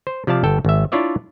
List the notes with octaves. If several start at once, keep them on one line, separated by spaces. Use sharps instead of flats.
C5
C3 F3 D5 F5 A5
G1 A4 G5
G#1 E5
D4 E4 F4 C#5 D5 E5